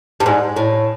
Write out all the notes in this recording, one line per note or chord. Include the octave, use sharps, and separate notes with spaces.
G2
G#2
A2